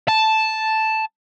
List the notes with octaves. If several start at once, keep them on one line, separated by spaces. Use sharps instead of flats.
A5